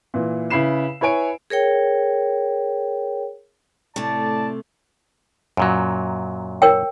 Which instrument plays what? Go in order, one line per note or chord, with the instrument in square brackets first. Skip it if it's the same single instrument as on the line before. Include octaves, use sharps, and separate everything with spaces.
[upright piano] A#2 E3
C#3 E4 B4 B5 C7 E7
E4 B4 C#5 G#5 D7
[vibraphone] G#4 A#4 C#5 G5
[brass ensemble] A2 D5 A5 [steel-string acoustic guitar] C3 A3
[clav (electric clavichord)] F#2 A#2 F#3
[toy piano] A#4 C#5 G5